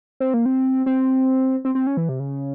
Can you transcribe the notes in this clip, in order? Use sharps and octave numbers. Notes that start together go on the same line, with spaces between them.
C4
A#3
C4
C4
C4
C4
C#4
E3
C3
C#3